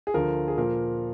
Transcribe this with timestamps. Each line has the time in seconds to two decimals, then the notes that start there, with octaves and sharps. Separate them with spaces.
0.07 G#4
0.14 D2 D3 F3 A#4
0.48 G#4
0.57 A#2 F3 A#4